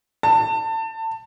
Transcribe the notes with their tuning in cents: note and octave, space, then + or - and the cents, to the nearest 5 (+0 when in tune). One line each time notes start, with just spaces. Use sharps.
A5 +25